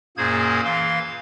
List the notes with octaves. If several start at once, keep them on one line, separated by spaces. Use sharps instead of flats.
F#2 A#2 A#3 G#4 C5 G#6
E3 F5 C6